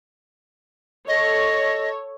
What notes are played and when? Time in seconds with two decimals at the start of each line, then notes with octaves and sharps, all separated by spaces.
1.08 A4 C#5 D#5